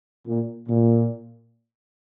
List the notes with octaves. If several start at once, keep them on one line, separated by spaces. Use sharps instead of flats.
A#2
A#2